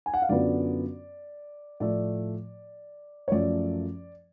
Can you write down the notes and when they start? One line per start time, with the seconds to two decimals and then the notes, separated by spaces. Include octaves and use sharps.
0.06 G#5
0.14 F#5
0.22 F5
0.29 F#2 D3 F#3 B3 F4 D5
1.80 A2 F3 A3 D5
3.28 C#5
3.31 F#2 F3 A3 D5